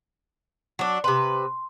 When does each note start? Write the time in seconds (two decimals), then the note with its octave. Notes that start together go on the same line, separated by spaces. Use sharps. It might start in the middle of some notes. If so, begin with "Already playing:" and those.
0.79 F#3 D4
1.04 C3 B4 C6